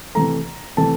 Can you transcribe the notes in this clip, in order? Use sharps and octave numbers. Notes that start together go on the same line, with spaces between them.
C3 E3 A3 A#5
C3 E3 A3 A5